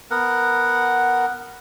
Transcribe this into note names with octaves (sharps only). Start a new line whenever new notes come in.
B3 A#4 F#5